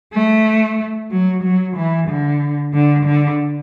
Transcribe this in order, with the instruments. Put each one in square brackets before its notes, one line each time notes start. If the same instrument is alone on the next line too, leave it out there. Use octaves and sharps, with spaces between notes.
[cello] A3
F#3
F#3
E3
D3
D3
D3